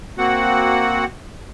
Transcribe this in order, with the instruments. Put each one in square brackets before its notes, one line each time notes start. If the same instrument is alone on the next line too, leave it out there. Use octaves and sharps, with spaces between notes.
[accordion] A#3 C4 F#4 F#5